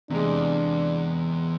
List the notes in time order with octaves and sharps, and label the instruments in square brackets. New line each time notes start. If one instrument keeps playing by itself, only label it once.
[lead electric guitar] E2 [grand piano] C3 G#3 [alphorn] D4